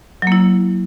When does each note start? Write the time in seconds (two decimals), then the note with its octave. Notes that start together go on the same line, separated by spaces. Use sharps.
0.22 F#3
0.27 A#3
0.32 E4